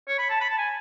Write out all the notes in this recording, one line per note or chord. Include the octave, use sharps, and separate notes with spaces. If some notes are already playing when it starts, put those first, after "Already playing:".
C#5
B5
A5
B5
A5
G#5